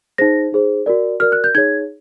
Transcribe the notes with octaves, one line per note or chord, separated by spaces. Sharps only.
D#4 G#4 C5 A#6
D#4 G#4 C5
F#4 A#4 D5
F#4 A#4 D5 F6
F#6
G6
D#4 G#4 C#5 G#6